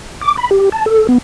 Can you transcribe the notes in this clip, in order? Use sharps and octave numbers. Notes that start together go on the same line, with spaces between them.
D6
B5
G4
A5
A4
B3